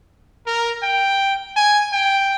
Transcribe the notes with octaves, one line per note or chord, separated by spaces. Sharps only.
A#4
G5
G#5
G5